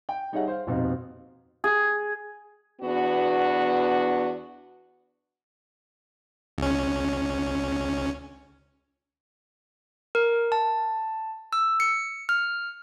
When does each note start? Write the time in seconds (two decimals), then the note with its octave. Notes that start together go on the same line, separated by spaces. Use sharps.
0.09 G5
0.32 G3 D#4 G#4 C#5 E5 F#5
0.48 C5 F5
0.67 D#1 F2 B2 C4 D#4 F5
1.64 G#4
2.81 E2 B3 D4 F#4
6.58 C#2 C#4
10.15 A#4
10.52 A5
11.53 E6
11.80 C#7
12.29 F6